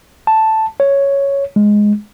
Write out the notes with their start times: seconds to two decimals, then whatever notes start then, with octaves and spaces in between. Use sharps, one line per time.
0.27 A5
0.80 C#5
1.56 G#3